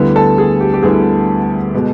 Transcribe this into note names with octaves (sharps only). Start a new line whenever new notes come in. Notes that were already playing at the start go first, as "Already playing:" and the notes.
Already playing: D2 D3 G3 B3 E4
A4
G#4
G4
G4
D2 D3 G3 B3 E4 G#4
B2 G#3 B3